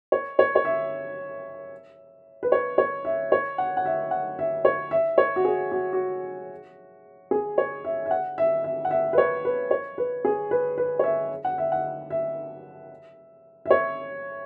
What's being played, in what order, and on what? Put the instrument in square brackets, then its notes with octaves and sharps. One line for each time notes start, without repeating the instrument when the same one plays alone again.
[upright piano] C#5
C#5
C#5
E5
B4
C#5
C#5
E5
C#5
F#5
F#5
E5
F#5
E5
C#5
E5
C#5
F#4
G#4
F#4
F#4
G#4
C#5
E5
E5
F#5
E5
E5
F#5
E5
B4
C#5
B4
C#5
B4
G#4
B4
B4
C#5
E5
F#5
E5
F#5
E5
E5
C#5